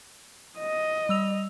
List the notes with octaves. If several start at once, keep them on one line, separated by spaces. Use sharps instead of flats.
D#5
G3 E6 F7